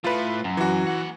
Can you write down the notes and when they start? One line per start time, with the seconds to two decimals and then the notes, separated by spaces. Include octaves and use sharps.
0.04 A2 A3 F4 B4
0.44 F#2
0.57 E3 F#4
0.87 A#3 F#5